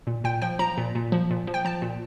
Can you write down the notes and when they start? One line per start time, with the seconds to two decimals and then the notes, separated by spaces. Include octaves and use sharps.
0.07 A#2
0.24 A#2 G5
0.42 F3 G5
0.59 F3 A#5
0.77 A#2
0.95 A#2
1.12 F3
1.31 A#2
1.47 F3
1.54 G5
1.65 F3 A5
1.82 A#2